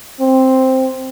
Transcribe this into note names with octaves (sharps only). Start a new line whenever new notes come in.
C4